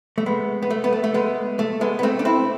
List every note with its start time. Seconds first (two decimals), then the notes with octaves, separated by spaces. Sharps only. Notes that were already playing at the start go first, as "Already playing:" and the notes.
0.18 A3
0.26 G#3 B3
0.62 B3
0.70 A3
0.84 B3
0.93 A3
1.04 A3
1.14 G#3 B3
1.59 A3
1.81 G#3 B3
1.99 B3
2.03 A3 C4
2.19 D4
2.25 C4 E4